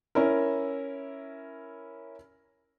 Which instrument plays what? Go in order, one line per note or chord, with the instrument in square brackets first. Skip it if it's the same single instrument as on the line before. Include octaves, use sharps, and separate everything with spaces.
[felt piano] C#4 E4 A#4